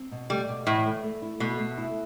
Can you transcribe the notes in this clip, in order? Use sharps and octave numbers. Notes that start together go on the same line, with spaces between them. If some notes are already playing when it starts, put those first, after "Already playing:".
Already playing: C4
B2
G3 A3
B2
A2 E3
A3
A3
E4
B2 A3
A3
E4